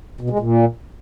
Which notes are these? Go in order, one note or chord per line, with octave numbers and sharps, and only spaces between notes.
B2
G#3
A#2